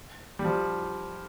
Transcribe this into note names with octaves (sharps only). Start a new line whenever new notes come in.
G3
F3